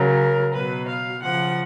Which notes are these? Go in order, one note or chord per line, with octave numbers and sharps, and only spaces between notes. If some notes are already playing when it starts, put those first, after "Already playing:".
Already playing: C#3 F#3 A#4
B2 F#3 B4
F5
C#3 F3 F#5